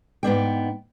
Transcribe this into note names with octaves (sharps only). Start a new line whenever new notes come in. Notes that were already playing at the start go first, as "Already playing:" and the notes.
G#2 B3 D4 G5